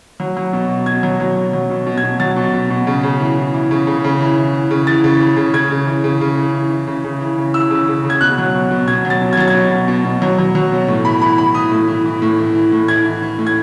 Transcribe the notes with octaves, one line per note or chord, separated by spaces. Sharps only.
F#3
F#3
B2
B2
B2 G#6
F#3
F#3
B2
F#3
B2
B2
G#6
B2
F#3 A6
B2
B2
B2
C#3
C#3
E3
E3
E3
C#3
C#3
C#3
E3
E3
E3
C#3
E3 A6
C#3
E3
C#3
C#3 G#6
C#3
E3
C#3
C#3
E3
E3
E3
C#3
C#3
E3
C#3
E3 E6
C#3
C#3
C#3
G#6
B2 F#6
F#3
B2
B2
B2 G#6
F#3
A6
B2
G#6
F#3 A6
G#6
B2
F#3
B2
B2
F#3
F#3
F#3
B2
A2
E3 B5
E3 B5
E3 B5
E3 D#6
A2
E3
E3
A2
E3
E3
A2
E3 G#6
E3
E3
A2
G#6